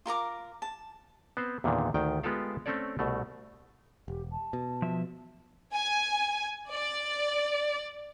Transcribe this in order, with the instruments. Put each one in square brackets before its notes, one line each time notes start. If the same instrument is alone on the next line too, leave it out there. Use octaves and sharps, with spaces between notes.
[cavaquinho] F4 A#4 A#5 D6
A5
[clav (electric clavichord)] B3 C4 C5
E2 A#2 D3 D#3
D2 D#3 G5
G#3 B3 F4 G4 A4 F5
A3 C4 C#4 A4 C#5 D5
C2 B2 A3
[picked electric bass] E1 [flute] G4
[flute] A5
[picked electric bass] B2
[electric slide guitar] F3 E5
[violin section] G#5
D5